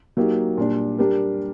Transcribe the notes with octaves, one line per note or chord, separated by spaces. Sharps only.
F#3 A#3 D#4 G4
A#2 G3 D4
G3 D4 G4 A#4